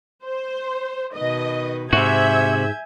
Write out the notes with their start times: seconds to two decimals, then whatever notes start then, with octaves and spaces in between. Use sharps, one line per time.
0.24 C5
1.14 B2 D#3 B4 D#5
1.93 G#2 C3 F#4 E5 G#5 G6 G#6